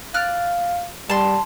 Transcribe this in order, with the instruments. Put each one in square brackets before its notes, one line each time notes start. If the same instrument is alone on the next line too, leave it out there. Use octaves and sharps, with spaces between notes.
[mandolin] D5 F6 F#6 [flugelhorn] F5
[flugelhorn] G3 [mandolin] A5 C6